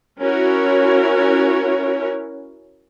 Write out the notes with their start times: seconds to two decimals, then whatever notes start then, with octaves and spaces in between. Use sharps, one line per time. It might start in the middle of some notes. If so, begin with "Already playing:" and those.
0.20 C#4 E4 F#4 A#4 C#5